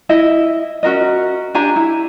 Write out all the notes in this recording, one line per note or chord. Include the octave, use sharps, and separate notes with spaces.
E4 D#5 E5
C#4 F#4 A#4 D#5
D4 G4 G#5 A#5
E4